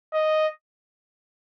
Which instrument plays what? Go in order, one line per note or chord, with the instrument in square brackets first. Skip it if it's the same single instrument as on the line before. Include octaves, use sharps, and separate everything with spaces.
[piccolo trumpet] D#5